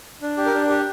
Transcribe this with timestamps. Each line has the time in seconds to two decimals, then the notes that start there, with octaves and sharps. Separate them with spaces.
0.22 D4
0.37 G4
0.46 A#4
0.54 D4
0.69 G4